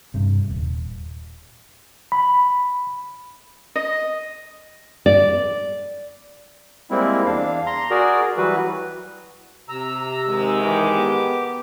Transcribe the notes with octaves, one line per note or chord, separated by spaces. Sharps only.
G2 C3
D#1
B5
D#5
D5
G3 G#3 A#3 C4 E4
E2 D4 F5
A#5 C6
F#4 G#4 A#4 D5
E3 F#3 G3 F#4 B4
C3 A#5 E6
G#2 D#3 G#3
E3 G4 D6
B3